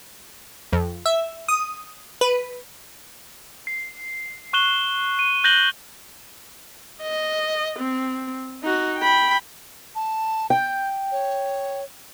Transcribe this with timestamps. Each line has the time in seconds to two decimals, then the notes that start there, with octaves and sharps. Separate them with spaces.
0.73 F2
1.06 E5
1.49 D#6
2.21 B4
3.67 C7
4.53 C#6 F#6 E7 G7
5.19 D#7
5.44 F#6 G6 A#6 F#7 G7
7.02 D#5
7.79 C4
8.63 D#4 F#4
8.99 G5 B5
9.95 A5
10.50 G5 G6
11.11 C#5